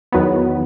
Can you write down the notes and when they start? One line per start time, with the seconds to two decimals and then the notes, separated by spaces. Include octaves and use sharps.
0.12 E2 D#3 F#3 B3